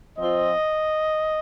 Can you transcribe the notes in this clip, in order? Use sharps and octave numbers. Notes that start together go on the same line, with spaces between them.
F3 C4 F4 D#5